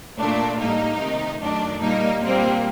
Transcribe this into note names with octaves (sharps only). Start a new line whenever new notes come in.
A#2 A3 D4
A2 G3 A#3 D#4
C3 D#3 A3
F#2 D#3 A3 D4
A#2 G3 A#3 D#4
A#2 G3 A#3 C4